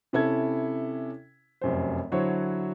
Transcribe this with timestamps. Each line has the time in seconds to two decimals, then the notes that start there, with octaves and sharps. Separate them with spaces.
0.13 C3 C#4 E4 A4 G#6
1.61 F1 F#2 C5
2.12 D3 F#3 E4 F#4 C5 C#5